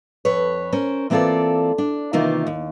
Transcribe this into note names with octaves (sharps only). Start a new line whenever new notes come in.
F2 B4 C#5
C#4 A#4 C5
E3 A#3 C4 F4 A4 D5
D4
C3 D#3 E3 A#3 D#4 F4
D#2